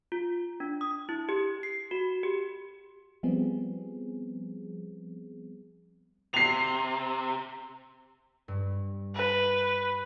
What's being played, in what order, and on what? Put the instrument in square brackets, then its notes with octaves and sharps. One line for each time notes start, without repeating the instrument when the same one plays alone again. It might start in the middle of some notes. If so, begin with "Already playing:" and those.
[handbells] F4
D4
D#6
E4
G4
C7
F#4
G4
[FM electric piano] F3 G3 B3 C4 G#4
[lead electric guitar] C3 [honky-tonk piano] C7 F7
[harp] G2
[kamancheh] B4